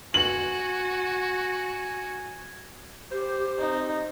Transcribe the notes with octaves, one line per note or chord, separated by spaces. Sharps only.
F#4 G#5 F#7
G4 C5
C4 D#4